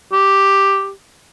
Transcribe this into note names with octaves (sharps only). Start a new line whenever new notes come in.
G4